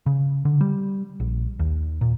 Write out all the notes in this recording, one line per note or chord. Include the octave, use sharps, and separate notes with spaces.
C#3
D3
G3
A#1
D#2
A#2